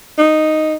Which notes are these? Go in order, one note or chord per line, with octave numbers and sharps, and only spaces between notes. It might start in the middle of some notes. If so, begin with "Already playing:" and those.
D#4